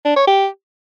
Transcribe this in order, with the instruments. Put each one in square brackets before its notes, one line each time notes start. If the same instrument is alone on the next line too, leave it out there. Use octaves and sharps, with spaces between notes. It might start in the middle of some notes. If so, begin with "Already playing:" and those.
[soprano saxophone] D4
C#5
G4